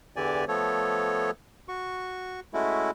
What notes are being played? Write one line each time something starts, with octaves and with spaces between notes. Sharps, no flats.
E2 D3 E3 G4 D5 G#5
F3 A3 B3 A4 C#5
F#4 C#6
G#3 A3 C#4 E4 F#4